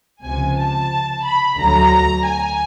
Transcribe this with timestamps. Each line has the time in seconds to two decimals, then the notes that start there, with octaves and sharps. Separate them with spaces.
0.22 C#2 C3 F3 G#5
0.56 A5
1.23 B5
1.56 D2 D3 F#3 A#5
2.24 G#5